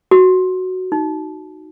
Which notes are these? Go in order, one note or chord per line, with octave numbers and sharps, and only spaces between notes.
F#4
D#4